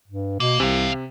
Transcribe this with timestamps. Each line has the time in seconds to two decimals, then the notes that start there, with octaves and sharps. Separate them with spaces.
0.08 G2
0.40 B2 A#3
0.60 C2 C3 E3 F5